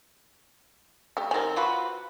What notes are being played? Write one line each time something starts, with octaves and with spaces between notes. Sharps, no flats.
A3 G4
D#3 C4 A#4 G#5
F4 F#4 B4